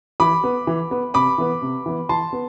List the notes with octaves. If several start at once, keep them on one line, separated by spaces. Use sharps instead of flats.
E3 B5 D6
B3
E3
B3
C3 B5 D6
E3 B3
C3
E3 B3
E3 A5 C6
B3